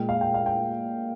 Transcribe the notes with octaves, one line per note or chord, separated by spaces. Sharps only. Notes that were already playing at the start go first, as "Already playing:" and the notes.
Already playing: A#2 G#3 G5
F5
G5
F5
G5